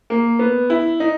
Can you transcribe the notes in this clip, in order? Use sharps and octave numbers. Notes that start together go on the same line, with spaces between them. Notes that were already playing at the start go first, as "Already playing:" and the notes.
A#3
B3
E4
D#4